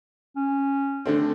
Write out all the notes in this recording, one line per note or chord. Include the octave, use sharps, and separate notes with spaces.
C#4
D3 A3 C4